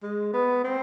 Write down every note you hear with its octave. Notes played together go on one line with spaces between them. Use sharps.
G#3
B3
C4